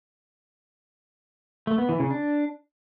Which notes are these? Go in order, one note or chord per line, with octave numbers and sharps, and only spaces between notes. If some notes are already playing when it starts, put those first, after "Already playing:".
A3
B3
E3
C#3
D4